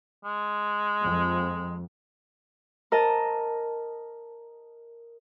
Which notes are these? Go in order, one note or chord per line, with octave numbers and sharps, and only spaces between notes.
G#3
F2
A#4 D#5 A5